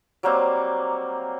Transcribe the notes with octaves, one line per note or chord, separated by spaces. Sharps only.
F#3 G3 A#3 C4